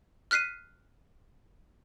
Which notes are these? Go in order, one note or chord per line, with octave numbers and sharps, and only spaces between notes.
F6 F#6 B6 C7 D#7